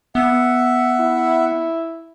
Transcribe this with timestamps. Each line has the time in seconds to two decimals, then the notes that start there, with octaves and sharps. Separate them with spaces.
0.15 B3 E5 F#5
1.00 E4